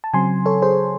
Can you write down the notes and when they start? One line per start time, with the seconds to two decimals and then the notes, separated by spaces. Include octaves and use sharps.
0.04 A5
0.14 C#3 F#3 C4 G#5 C6
0.46 A4 C#5
0.62 G#4 C5